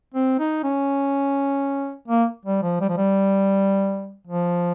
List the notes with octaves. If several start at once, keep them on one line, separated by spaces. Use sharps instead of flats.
C4
D#4
C#4
A#3
G3
F3
G3
F3
G3
F3